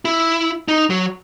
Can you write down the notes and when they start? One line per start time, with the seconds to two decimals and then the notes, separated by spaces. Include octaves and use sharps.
0.05 E4
0.68 D#4
0.90 F#3